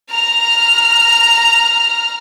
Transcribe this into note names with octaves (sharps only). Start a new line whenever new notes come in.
A#5 F6